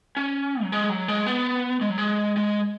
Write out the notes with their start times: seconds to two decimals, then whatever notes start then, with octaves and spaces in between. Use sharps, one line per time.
0.17 C#4
0.63 F#3
0.72 G#3
0.89 F#3
1.08 G#3
1.26 B3
1.81 G#3
1.90 F#3
1.98 G#3
2.37 G#3